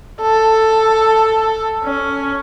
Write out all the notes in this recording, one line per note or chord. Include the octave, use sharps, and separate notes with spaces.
A4
C#4